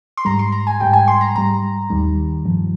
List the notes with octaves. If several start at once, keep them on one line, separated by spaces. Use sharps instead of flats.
C6
G#2 G3 A#5
C6
A#5
G#5
G#2 G3 G5
G#5
C6
A#5
G#2 G3 A#5
D#2 D#3 G3
G2 F3